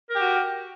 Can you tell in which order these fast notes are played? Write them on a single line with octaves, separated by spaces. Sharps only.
A#4 G4 F#4